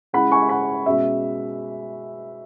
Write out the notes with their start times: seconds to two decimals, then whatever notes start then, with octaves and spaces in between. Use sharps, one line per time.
0.13 C#3 G#3 E4 F#5 B5
0.32 G#5 C#6
0.49 F#5 B5
0.86 B2 G#3 C#4 E5